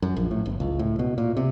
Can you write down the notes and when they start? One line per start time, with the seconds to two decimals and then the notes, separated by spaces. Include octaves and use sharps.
0.02 F#2
0.17 A#1
0.31 A2
0.46 G1
0.60 C#2
0.79 A2
0.99 B2
1.18 A#2
1.37 C3